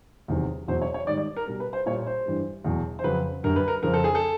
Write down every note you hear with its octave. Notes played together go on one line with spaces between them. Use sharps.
E2 C3 D#3 F#3
E2 B2 F#3 C5
C#5
C#5
G#2 D#3 G3 D5
D5
A#4
B2 G3 A#4
B4
C5
A#2 G3 C#5
C5
G2 E3 G3
E2 B2 F#3
C5
F2 C#3 F#3 B4
F#2 D3 G3 A#4
B4
A#4
F2 C#3 F3 A#4
A4
G#4
A4